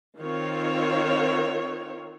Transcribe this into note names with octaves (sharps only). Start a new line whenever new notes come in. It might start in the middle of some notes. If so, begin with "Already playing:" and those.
D#3 C4 F4 C#5